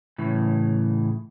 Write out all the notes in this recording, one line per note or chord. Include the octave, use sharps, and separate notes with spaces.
A2 C#3 E3